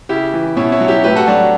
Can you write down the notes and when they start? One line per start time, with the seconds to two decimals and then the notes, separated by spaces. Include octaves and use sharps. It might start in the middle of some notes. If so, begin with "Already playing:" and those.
0.09 C#3 E4 G4
0.33 E3
0.57 B2 C#4 E4
0.72 C#4 E4
0.80 F#3
0.88 E4 G4
1.04 A2 G4 B4
1.16 F#4 A4
1.28 F#3 D4 F#4